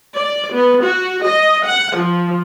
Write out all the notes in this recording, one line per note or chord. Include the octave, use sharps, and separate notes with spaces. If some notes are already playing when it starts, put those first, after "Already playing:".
D5
B3
F#4
D#5
F#5
F3